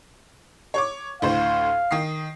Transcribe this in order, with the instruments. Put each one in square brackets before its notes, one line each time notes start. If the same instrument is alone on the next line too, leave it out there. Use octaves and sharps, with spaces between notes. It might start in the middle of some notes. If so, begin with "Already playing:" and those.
[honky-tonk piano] C#5 C#6 D6
[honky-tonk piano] D2 A2 C5 [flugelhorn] F5
[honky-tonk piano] D#3 D#6 C7